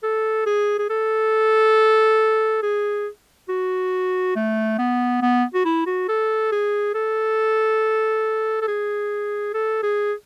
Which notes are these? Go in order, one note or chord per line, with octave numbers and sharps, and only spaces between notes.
A4
G#4
G#4
A4
G#4
F#4
A3
B3
B3
F#4
E4
F#4
A4
G#4
A4
A4
G#4
A4
G#4